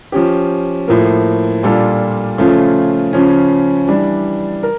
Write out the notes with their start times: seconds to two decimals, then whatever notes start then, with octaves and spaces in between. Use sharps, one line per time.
0.12 F3 C#4 G4
0.88 A2 F3 A#3
1.63 A#2 G3 D4 F4 A4
2.38 C#3 F3 A3 C#4 F4
3.13 C#3 F3 C#4
3.87 E3 G3 D4
4.63 A#4